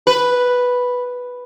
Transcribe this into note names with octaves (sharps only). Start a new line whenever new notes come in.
B4